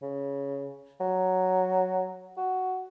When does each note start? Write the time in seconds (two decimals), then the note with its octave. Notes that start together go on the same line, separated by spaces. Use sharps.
0.02 C#3
1.00 F#3
2.37 F#4